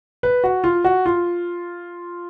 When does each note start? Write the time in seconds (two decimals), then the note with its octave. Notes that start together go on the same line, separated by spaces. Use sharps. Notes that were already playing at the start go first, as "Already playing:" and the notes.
0.23 B4
0.44 F#4
0.64 F4
0.84 F#4
1.06 F4